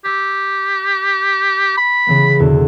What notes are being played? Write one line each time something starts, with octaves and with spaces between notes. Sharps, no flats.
G4 E6 G#6 B6
B5
C#3 E3 B3
E2 B2 D3